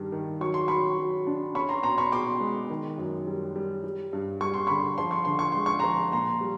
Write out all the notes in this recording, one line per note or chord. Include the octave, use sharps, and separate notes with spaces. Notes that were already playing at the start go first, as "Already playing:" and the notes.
Already playing: G2 D#3 G3
D#3
F#3 C#6
C6
F#3 B5 C#6
F#3
D4
C#4 B5 C#6
A#5 C6
B2 A#5 C6
B5 C#6
B2 C6 D6
G#3
D#3
F#2
G3
G3
G3
G2
G3 C#6
C6
D3 B5 C#6
F3 C6
C#6
D3 C6
C#6
G#3 C6
C#6
F3 A#5 C6
A#2 A#5 C6
G3